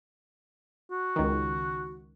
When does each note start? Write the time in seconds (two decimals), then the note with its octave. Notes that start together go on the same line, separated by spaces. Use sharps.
0.91 F#4
1.16 C#2 D#3